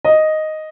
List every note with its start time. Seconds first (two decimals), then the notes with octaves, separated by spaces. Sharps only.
0.05 D#5